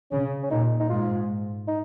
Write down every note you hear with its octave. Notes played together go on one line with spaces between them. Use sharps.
C#3 C#4
C#4
A#2 D#4
D#4
G#2 F4
D#4